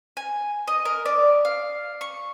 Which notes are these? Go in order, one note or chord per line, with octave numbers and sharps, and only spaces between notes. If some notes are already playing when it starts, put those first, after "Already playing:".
G#5
D#5
A#4
D5
F5
C#6